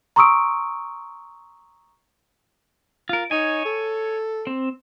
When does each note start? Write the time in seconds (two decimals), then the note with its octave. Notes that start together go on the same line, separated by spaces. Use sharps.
0.16 A#5 C6 C#6 D#6 E6 D7
3.09 F4 A#4
3.31 D#4 C#5 G#5
3.65 A4
4.47 C4